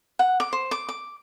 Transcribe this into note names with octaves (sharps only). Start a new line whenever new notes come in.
F#5
D6
C5
D6
D6